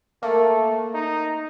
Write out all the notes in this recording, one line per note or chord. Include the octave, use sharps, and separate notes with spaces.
A3 A#3
D#4